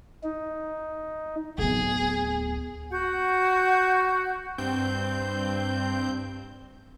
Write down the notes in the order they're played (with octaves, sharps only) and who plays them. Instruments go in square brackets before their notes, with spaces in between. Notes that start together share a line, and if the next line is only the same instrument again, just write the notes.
[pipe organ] D#4
[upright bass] D1 B3 [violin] G#4
[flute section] F#4 F#5 G6
[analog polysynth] G2 C4 G6